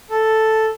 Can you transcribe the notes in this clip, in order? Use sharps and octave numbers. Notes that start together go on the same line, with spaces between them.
A4